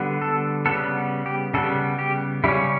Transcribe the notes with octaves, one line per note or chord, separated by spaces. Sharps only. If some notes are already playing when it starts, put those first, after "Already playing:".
Already playing: D3 G3 B3
A4
C#3 G3 B3 A4
G4
C#3 G3 B3 A4
G4
C#3 G3 C#4 E4